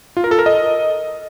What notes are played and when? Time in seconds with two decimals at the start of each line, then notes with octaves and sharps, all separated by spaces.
0.17 F4
0.24 A#4
0.31 A4
0.39 A#4
0.46 D#5